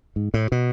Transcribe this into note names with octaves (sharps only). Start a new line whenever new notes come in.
G#2
A2
B2